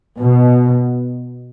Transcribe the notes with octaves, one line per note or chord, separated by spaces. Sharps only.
B2